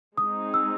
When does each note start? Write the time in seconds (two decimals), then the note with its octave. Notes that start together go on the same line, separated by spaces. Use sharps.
0.17 G#3 C4 D#4 G#4 D#6
0.54 E6